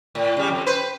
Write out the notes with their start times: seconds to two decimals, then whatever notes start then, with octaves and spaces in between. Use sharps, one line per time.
0.15 A2
0.37 C#3 G3
0.48 F2
0.66 B4 C5